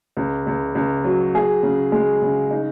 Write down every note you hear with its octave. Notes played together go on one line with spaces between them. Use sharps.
C#2
C#2
C#2
F#3
G#4
C#3
G#3
C#3
D#4